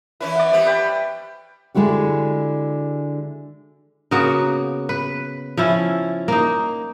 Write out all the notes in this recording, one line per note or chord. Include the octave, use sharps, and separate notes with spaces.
E3 C#4 E4 B4
D5 F#5
G3 B3 C4
B4 G5
D3 G#3 E4 F#4 G4
C#3 A#3 B3 F#4
B4
F3 C#4 E4
A#3 D#4